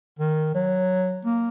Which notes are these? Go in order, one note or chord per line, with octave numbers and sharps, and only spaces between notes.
D#3
F#3
A#3